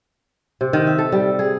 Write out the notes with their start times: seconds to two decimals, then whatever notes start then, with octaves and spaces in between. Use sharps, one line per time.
0.61 C3
0.73 D#3
0.87 E5
0.98 A4
1.12 G3
1.39 G#4